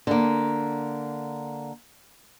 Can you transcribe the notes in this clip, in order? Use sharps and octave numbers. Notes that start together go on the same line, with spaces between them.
D3 A#3